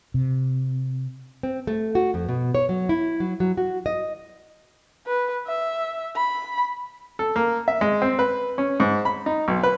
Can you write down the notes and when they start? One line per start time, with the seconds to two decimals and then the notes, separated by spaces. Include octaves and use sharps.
0.14 C3
1.43 C4
1.67 A3
1.95 F#4
2.14 F2
2.29 B2
2.55 C#5
2.69 F#3
2.89 E4
3.20 F#3
3.40 F#3
3.57 F#4
3.86 D#5
5.07 B4
5.47 E5
6.16 B5
7.19 A4
7.36 A#3
7.68 E5
7.81 G#3
8.02 C4
8.19 B4
8.58 C#4
8.80 G#2
9.05 B5
9.26 D#4
9.48 B1
9.63 B4